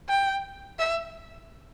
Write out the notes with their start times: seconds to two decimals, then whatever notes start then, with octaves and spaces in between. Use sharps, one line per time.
0.09 G5
0.79 E5